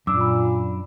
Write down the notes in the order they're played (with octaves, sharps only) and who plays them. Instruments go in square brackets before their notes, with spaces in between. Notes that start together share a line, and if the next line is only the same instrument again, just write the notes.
[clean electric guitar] F#2 D4 [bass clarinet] A#2 [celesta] D6 E6
[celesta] B5